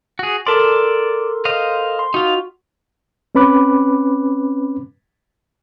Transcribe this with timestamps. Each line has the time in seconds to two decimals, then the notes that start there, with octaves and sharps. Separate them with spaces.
0.19 F#4 G#4
0.47 A4 A#4 D5 A5 C6
1.45 C5 D#5 F5
1.99 C6
2.14 D#4 F4 F#4
3.35 C4 C#4 B4 B5 D6 F#6